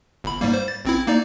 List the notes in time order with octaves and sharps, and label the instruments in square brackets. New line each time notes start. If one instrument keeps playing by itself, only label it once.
[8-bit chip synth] G1 B5
G#2 G3 A#3
C5
A6
A1 C4 E4
A#3 D#4 D5